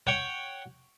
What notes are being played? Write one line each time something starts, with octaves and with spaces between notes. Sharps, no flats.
C#5 F#5 G5